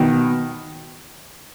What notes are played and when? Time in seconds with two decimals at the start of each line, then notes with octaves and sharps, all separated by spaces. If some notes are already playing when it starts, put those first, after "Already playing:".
Already playing: B2 D#3